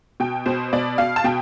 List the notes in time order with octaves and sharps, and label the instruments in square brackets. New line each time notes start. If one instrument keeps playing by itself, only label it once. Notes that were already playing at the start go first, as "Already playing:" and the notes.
[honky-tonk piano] B2 G5
B2 C5
B2 D5
B2 F5
A5
B2 G5